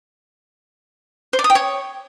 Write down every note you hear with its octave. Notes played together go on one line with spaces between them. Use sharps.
C5
D5
D#6
G5
C#5